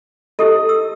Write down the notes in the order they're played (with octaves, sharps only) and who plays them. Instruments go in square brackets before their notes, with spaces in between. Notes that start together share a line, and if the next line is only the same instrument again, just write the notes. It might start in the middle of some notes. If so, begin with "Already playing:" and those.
[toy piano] E4 G4 A4 [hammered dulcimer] D#5
[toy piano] E6